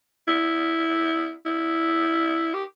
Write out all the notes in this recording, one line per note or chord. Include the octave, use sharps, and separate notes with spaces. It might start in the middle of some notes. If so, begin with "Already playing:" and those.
E4
E4
G4